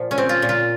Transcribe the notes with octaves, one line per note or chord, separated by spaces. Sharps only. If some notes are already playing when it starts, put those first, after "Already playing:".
Already playing: A#2 F3
C#4
C4
F4
A#2
F4